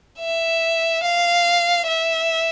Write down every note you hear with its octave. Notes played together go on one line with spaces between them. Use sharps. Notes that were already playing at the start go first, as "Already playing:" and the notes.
E5
F5
E5